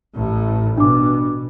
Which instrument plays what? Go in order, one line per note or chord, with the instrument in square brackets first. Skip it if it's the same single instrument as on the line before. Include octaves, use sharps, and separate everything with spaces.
[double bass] A1 A2
[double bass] B2 [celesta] D4 D6